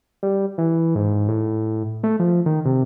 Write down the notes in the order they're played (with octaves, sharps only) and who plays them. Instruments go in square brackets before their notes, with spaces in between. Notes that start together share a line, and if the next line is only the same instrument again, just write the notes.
[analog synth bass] G3
E3
G#2
A2
A3
F3
D#3
C3